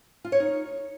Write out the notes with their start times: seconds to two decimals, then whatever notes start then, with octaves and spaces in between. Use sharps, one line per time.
0.24 F4
0.32 C#5
0.40 D#4